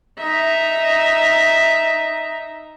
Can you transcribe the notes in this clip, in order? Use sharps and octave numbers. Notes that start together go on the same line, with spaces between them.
D#4 E5